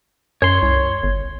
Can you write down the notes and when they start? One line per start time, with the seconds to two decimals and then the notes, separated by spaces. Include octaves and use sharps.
0.42 F#2 C#5 C6
0.62 C2
1.03 G1